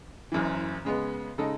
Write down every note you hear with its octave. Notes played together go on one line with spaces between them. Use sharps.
F#1 F#2 E3
C#3 G#3 B3
C#3 G#3 D#4 A4